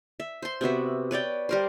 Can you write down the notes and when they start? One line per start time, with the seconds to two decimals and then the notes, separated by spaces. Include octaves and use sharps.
0.20 E5
0.42 C5 C6
0.61 C3 B3 F#4 E5
1.11 B4 C#5 D5 G5
1.49 G3 A#4 C5